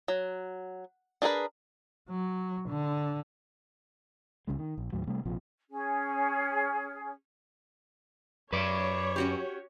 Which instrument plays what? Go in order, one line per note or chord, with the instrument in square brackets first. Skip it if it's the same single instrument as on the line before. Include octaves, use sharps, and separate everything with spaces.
[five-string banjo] F#3
D4 G#4 A#4 B4
[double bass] F#3
D3
[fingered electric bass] C#2 C#3 G#3
D#3
A#1
D#2 A2 F#3
C3 G3 A3
A#1 C3 F3
[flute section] C#4 G#4
[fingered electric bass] F#2 [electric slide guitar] B4 D5 [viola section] C#5
[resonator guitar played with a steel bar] C#4 F#4 G4